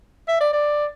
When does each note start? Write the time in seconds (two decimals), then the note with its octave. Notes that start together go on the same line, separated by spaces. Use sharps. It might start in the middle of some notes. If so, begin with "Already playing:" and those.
0.28 E5
0.41 D5
0.53 D5